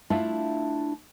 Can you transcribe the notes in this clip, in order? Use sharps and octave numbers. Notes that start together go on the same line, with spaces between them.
A3 D4 E4 F4 E5 F5